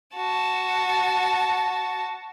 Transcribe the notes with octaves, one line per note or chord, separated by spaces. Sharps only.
F#4 A5